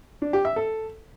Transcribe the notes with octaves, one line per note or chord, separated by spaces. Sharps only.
D4
G4
E5
A4